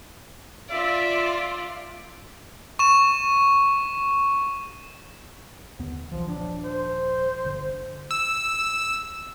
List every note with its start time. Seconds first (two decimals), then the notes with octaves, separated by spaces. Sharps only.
0.71 F4 D5 E5
2.79 C#6 E7
5.79 D#2 D3 B3
6.11 B1 E3 F3
6.28 D#1 F3 D4
6.64 C5
7.45 G1 D3
8.11 E6